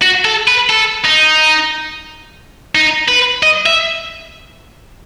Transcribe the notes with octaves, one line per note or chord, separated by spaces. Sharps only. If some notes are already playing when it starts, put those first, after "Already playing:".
F#4
A4
B4
A4
D#4
D#4
B4
D#5
E5